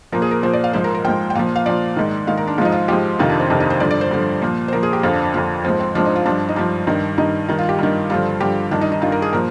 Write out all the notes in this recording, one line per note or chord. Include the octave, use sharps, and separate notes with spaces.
A#2 F3 A#4
G#4
A#4
A#2 F3 C5
D5
F5
G#2 F3 C5
A#4
A#4
G#2 F3 G5
G5
A#2 F3 F5
F5
A#2 F3 D5
G#2 D#3
G#2 D#3 F5
A#4
D4
G#2 F3 D#4 F4
F4
G#2 F3 G4
F2 C3 D#3 F4
D4
C4
F2 C3 D#3 D4
D#4
C5
G2 D3 F3 D5
D5
C5
G2 D3 F3
A#2 F3
C5
A#2 F3 A#4
G#4
G4
F2 D3 F3 F4
D4
D4
F2 D3 F3 D4
G#2 F3 C4
C4
G#2 F3 D4
D#4
F4
G2 F3 D4
D#4
G2 F3 D4
G2 D#3
G2 D#3 D#4
G2 D#3 D#4
F4
G4
G2 D#3
G2 D3 F3 F4
G2 D3 F3 G4
G2 D#3 D4
D#4
D#4
G2 D#3 F4
A#4
G#4
A#2 F3 A#4